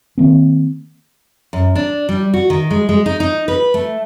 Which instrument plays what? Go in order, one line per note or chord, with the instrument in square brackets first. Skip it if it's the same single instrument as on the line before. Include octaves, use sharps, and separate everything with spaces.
[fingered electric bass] D#3 A#3 C4
[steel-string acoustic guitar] F#2
D4
G3
F#4
D#3
G#3
G#3
D#4
D#4
B4
A3